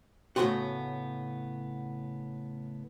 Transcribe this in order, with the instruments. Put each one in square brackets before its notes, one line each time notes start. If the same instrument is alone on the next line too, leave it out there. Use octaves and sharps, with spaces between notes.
[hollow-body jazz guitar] A2 C#3 B3 D4 F4 F#4